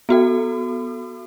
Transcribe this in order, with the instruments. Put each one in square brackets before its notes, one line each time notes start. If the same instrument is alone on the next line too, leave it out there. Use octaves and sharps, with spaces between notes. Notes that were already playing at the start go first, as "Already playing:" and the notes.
[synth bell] B3 F#4 A4